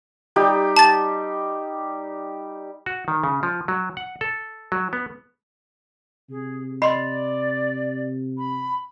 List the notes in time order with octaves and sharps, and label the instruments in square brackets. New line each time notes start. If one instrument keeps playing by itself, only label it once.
[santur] G3 D#4 G4
[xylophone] A5 A6
[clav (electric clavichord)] F#4
D#3
C#3
F3
F#3
F#5
A4
F#3
B3
[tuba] C3 [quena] G#4
[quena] D5 [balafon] D#5 [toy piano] B5 C6
[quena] B5